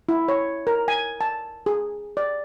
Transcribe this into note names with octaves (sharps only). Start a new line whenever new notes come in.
E4
C#5
A#4
G#5
A5
G#4
D5